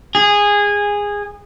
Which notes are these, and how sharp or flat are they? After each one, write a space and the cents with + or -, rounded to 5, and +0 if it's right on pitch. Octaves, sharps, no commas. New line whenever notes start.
G#4 -15